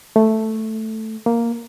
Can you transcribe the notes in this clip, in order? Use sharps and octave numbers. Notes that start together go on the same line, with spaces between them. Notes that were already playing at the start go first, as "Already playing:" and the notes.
A3
A#3